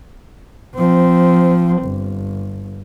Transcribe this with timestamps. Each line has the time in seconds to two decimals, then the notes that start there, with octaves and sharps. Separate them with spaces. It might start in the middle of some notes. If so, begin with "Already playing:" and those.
0.76 F3 C4
1.83 G1